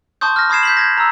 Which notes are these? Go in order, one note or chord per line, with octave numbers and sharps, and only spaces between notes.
A5 C6 C#6 D#6 G6
F6 A#6
B5 D#6 G#6 C7 E7
G6 B6 F#7
G6 G#6 A#6
A#5 E6